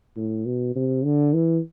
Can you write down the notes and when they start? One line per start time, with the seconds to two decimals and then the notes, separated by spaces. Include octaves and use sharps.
0.17 A2
0.46 B2
0.76 C3
1.04 D3
1.34 E3